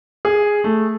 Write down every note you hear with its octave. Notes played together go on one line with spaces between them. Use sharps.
G#4
A3